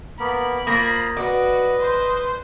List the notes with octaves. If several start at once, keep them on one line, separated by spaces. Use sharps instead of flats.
A#3 B3 A#4 B5
A#3 F4 C5 F5 D#6
F#4 B4 D5 D#5
C5